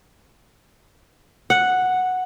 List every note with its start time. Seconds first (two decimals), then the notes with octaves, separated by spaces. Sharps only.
1.50 F#5